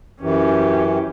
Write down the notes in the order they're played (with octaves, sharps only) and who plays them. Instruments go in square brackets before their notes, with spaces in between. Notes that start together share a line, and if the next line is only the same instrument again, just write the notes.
[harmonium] F#2 E3 [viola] C#4 G4